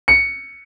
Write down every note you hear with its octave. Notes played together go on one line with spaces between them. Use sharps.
C#7